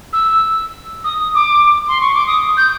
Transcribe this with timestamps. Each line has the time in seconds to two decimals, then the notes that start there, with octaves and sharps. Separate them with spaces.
0.13 E6
1.04 D#6
1.35 D6
1.88 C6
2.01 C#6
2.14 D6
2.27 D#6
2.57 G6